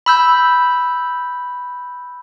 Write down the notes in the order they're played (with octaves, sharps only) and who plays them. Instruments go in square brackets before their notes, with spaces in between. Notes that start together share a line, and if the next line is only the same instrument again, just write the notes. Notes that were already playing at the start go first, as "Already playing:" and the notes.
[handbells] B5 E6 G6